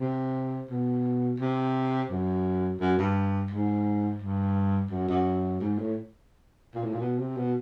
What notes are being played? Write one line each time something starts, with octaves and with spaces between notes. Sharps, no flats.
C3
B2
C3
F#2
F#2
G2
G#2
G2
F#2
F#2
G#2
A2
A#2
A2
A#2
B2
C3
B2